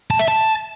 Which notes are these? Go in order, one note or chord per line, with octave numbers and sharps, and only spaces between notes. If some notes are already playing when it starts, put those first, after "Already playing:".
A5
E5
A5